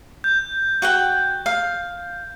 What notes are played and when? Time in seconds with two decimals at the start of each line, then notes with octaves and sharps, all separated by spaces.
0.24 G6
0.82 F#4 F#5 G5
1.46 F5